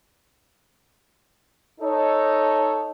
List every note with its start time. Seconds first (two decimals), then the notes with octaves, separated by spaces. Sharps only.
1.80 D#4 A4 C#5